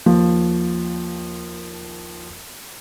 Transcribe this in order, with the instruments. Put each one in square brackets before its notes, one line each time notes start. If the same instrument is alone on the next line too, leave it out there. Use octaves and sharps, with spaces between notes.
[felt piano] D#2 F3